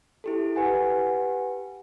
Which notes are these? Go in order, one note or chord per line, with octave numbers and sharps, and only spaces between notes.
E4 G4 A4
G4 B4 F#5 G#5